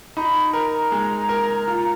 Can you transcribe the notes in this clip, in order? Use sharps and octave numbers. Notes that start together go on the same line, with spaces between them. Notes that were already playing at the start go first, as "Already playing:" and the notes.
D#4 B5
A#4 A#5
G#3
A#4
F4